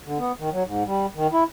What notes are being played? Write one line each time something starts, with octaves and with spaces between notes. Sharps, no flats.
D3
B3
D#3
F#3
G#2
G3
D#3
E4